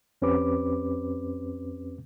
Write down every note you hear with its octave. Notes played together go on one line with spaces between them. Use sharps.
F2 C4 C#4 G4 B4 D6